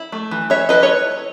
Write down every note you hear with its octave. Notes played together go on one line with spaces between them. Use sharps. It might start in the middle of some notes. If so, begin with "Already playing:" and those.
Already playing: E4
A3
E3
E3 C#5 E5
E4 B4 D#5
C#5